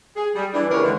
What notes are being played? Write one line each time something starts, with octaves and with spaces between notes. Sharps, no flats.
G#4
G3
E3 D4
D#2 C#3 D4 A#4 B4 C#5
D3 E3 G#3